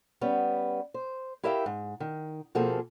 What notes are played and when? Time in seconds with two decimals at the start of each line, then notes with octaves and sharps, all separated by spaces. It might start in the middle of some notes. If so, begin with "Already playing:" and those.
0.21 G3 B3 C#4
0.94 C5
1.43 E4 G4 A#4 E5 F5 G5
1.66 G#2
2.00 D#3
2.55 B2 F3 A#3 C4 G#4 A4